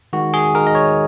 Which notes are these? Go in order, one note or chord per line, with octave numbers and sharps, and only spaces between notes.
D#3 G#3 F#4
G#4
D#3 G#3 A#4
D#5
C#5